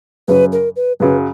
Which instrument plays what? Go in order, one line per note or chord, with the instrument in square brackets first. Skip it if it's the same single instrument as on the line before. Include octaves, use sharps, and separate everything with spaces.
[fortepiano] F#2 C#3 F#3 [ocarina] B4
[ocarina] A#4
B4
[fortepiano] F#2 C#3 F#3 [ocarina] B4